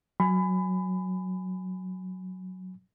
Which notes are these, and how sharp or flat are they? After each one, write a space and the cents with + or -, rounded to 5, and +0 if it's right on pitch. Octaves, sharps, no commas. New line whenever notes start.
F#3 +0 G#5 +0 B5 +25